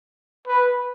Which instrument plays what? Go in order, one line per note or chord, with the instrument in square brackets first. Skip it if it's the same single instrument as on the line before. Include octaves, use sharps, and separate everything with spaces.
[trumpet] B4